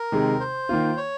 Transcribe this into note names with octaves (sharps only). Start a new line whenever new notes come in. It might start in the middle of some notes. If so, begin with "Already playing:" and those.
Already playing: A#4
C3 D#3 G#3 D#4 G#4
C5
D#3 A#3 F4
C#5